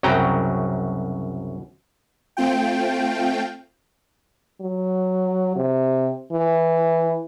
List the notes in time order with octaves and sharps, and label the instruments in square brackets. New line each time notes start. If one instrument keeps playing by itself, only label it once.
[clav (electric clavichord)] C2 F#2 C#3 F#3 G5 A#5
[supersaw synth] A3 C4 F4 G5
[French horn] F#3
C3
E3